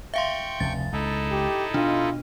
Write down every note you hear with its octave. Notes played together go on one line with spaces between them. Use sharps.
E5 F5 G5 C6 C#6
F1 D2 C#3 A6
C#2 D#4 E4 A4
G4
B2 D4 F4